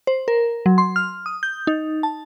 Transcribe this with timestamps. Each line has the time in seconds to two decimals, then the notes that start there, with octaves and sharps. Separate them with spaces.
0.07 C5
0.28 A#4
0.66 F#3
0.78 C6
0.96 F6
1.26 D#6
1.43 G6
1.67 D#4
2.03 A5